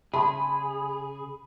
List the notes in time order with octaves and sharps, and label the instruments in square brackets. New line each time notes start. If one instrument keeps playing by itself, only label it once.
[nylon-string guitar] C#3 [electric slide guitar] G#4 [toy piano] E5 A5 C6 [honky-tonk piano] B5